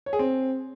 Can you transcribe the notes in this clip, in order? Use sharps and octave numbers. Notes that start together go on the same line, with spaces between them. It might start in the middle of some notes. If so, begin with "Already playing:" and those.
C#5
G#4
C4